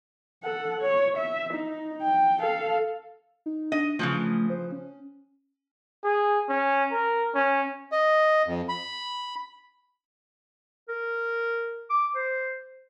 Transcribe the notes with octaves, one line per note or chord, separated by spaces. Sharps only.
A4 F#5
C#5
E5
D#4
G5
A4 F5
D#4
D4 D#5
C#3 E3 F3 A3
C5
C#4
G#4
C#4
A#4
C#4
D#5
F2
B5
A#4
D6
C5